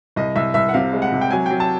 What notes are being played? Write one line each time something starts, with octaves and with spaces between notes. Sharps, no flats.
C2 D#5
C2 E5
C2 E5
F#5
C3 F5
G#3
F#5
C3
G5
F#3 G#5
F#3 G5
A5